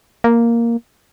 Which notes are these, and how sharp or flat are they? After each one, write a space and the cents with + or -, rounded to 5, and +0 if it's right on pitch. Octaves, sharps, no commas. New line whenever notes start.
A#3 +0